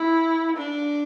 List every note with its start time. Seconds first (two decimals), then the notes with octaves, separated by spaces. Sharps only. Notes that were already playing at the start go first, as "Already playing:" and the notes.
Already playing: E4
0.56 D4